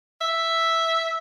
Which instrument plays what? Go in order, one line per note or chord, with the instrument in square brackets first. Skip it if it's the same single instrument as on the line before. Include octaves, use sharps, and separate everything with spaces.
[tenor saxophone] E5